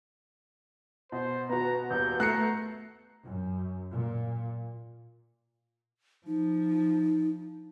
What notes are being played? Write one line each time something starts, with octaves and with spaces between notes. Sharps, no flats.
B2 C5
B3 F#4 A#5
D#1 G6
A3 A#5 F#6 C7 C#7
F#2
A#2
F3 D#4